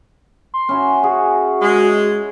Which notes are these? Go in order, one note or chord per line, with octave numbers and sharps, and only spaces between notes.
C6
C#4 E4 F#4
F#4 G#4
G#3